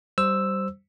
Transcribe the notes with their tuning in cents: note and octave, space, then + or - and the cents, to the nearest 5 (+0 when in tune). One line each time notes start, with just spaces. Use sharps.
G3 -15 C5 +0 E6 +0